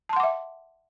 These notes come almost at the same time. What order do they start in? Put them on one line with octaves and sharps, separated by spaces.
A5 C6 F#5 D6 E5